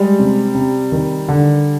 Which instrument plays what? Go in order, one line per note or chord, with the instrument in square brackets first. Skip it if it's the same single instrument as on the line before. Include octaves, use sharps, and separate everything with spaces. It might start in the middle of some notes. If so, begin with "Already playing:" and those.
Already playing: [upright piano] G3 [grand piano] G#3
[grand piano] C3
C3
D#3
D3